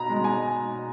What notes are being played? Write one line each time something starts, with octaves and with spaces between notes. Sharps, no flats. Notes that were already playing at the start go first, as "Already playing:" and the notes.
Already playing: B2 A#5 B5
G#3
G#5